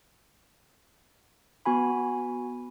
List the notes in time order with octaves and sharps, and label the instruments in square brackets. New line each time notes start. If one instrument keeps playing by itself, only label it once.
[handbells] B3 F#4 G#5 B5